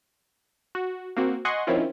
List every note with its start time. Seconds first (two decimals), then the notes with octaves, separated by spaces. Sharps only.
0.75 F#4
1.17 A#3 C4 F#4
1.45 D#5 F#5 G#5 C6 C#6
1.67 D#3 F3 C4 C#4 E4 F4